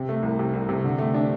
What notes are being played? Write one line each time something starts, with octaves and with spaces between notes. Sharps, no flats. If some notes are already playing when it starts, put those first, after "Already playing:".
Already playing: C3
A3
C2
C3
C2
C3
D3
A3
D4